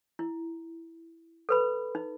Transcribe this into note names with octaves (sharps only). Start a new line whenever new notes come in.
E4
A4 B4 B5
D#4